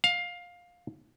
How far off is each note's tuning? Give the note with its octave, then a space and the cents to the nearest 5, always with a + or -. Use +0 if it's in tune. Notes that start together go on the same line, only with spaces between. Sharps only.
F5 +15